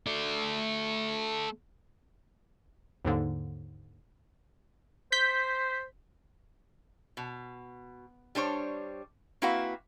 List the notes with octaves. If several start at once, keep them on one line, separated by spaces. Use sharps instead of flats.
A3 D5
D#2 G#2 D3 A#3
C5 G6 B6
B2
G3 D4 C5 C#5
A#3 C4 E4 F#4 B4 F5